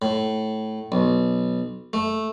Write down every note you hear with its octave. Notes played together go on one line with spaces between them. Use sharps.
A2
B1
A3